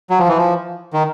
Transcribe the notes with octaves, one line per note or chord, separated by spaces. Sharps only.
F#3
F3
E3
F3
D#3